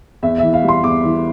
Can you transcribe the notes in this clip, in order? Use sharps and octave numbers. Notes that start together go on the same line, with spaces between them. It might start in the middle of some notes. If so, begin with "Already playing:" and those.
E2 E5
E3 E5
F5
G3 C6
E2 D6
E3